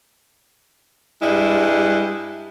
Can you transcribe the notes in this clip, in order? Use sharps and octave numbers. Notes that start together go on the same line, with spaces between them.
G2 G3 G#3 E4